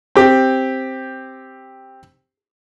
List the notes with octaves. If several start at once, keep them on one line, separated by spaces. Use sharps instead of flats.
C4 G4